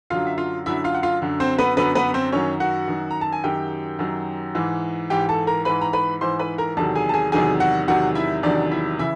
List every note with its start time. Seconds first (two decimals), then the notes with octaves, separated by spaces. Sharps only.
0.10 F#2 D3 F#3 F4 F5
0.26 E5
0.38 F4 F5
0.66 F#2 D3 F#3 E4 E5
0.84 F4 F5
0.95 F#5
1.03 F4 F5
1.22 F#2 D3 F#3
1.40 C4 C5
1.58 B3 B4
1.77 F#2 D3 F#3 B3 B4
1.95 B3 B4
2.14 C4 C5
2.32 F#2 D#3 F#3 C#4 C#5
2.60 F#4 F#5
2.88 F#2 D#3 F#3
3.11 A#5
3.21 A5
3.33 G#5
3.44 F#2 D#3 F#3 G4 G5
3.99 F#2 D#3 F#3
4.55 G#2 E3
5.10 G#2 E3 G4 G5
5.29 A4 A5
5.47 A#4 A#5
5.65 G#2 E3 B4 B5
5.82 A#5
5.93 B4 B5
6.21 G#2 E3 C5 C6
6.39 B4 B5
6.58 A#4 A#5
6.77 E2 C3 D#3 F#3 A4 A5
6.96 G#4 G#5
7.09 A5
7.14 G#4 G#5
7.32 E2 C3 D#3 F#3 G#4 G#5
7.60 F#4 F#5
7.88 E2 C3 D#3 F#3 F#4 F#5
8.15 E4 E5
8.43 E2 C3 D#3 F#3 D4 D5
8.71 E4 E5
8.99 C#3 E3 E4 E5